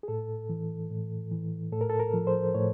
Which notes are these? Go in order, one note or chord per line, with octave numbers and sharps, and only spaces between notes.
G#4
A2 A4
E3
A2
E3
A2 A4
A#4
A4
A#4
F3
C5
A2 C#5